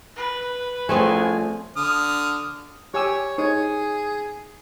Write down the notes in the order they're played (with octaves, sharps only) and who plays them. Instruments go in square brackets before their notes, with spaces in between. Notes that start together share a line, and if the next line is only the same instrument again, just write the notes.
[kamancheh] B4
[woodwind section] C2 G#5 [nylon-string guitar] F3 C#4 C5 [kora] A3 C4 G#4
[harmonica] D3 D#6 F6
[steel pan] G4 G#5 E6 [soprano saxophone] C#5
[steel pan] D#4 C#5 [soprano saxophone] G#4